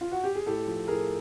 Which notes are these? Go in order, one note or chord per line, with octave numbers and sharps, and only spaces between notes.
F4
F#4
G4
G#4
A2 G4 A4
F3
A2 G#4 A#4